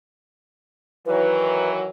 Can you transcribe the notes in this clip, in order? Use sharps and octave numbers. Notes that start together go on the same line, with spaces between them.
D#3 E3 F#3 B4